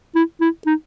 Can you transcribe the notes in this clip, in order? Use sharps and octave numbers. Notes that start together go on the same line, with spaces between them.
E4
E4
D#4